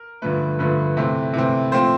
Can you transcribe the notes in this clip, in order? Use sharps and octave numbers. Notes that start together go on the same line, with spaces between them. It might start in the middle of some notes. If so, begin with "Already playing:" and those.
Already playing: A#4
G2 D3 F3 A3 B4
G2 D3 F3 A3 B4
C3 E3 A3 C4
C3 E3 A3 C4
A#2 F3 A3 C4 C5